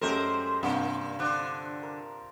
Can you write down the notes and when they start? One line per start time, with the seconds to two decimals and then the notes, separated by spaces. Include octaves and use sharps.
0.01 F#2 G#3 A3 G4 A#4 C5 E5
0.63 G2 C3 A#3 C#4 D4 F4
1.19 D3 C4 D4 C5 D#6
1.83 A#4